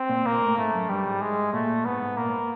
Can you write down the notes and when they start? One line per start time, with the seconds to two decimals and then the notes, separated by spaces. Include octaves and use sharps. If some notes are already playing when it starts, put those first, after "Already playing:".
Already playing: C4
0.09 A#2
0.25 A#2 A#3
0.41 A2
0.57 G#2 A3
0.74 F#2
0.89 G2 G3
1.06 G#2
1.21 G#3
1.53 A#2 A3
1.85 G#2 B3
2.01 G#2
2.17 A#2 A#3
2.28 G#2